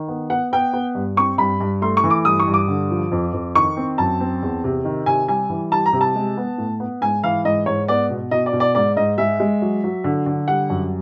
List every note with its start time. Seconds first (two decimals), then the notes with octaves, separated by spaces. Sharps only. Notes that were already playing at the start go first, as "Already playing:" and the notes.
Already playing: D#3
0.08 B3
0.30 B3 F#5
0.53 B3 G5
0.73 B3
0.95 G2
1.17 C4 C#6
1.38 G2 B5
1.61 G2
1.82 A3 C6
1.97 C#6
2.04 E3
2.10 D6
2.25 G2 D#6
2.40 C#6
2.48 G2
2.54 D6
2.68 D3
2.91 F3
3.12 F2
3.33 F2
3.55 D#3 C#6
3.77 C4
3.98 F#2 A5
4.20 C4
4.43 E2
4.64 C3
4.85 D#3
5.06 C3 G#5
5.28 G3 G#5
5.50 E3
5.72 G3 A5
5.86 A#5
5.93 C3
6.01 A5
6.16 G#3
6.37 B3
6.58 A2
6.80 B3
7.02 G#2 G#5
7.24 E3 F5
7.45 G#2 D#5
7.66 G#2 C#5
7.88 B3 D5
8.10 B2
8.31 B2 D#5
8.46 D5
8.53 B2
8.60 D5
8.75 G#2 D5
8.97 G#2 D#5
9.18 G#3 E5
9.40 G#3
9.62 F#3
9.84 F#3
10.04 D3
10.26 D3
10.48 G3 F#5
10.70 F#2